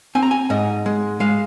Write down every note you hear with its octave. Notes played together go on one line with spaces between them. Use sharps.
C4 G#5
A#5
G#5
G#2 D#5
G#3
G#3 F5